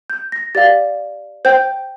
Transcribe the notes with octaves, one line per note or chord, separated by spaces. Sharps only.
G6
A#6
G4 D5 F5 A6
C5 G5 G6